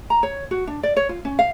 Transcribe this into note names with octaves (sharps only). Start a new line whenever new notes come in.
A#5
C#5
F#4
D4
D5
C#5
F4
C#4
F5